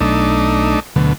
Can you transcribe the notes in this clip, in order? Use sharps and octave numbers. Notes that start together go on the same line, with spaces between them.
B1 A3 D4 D#4
D2 B2 D3 F#3 A3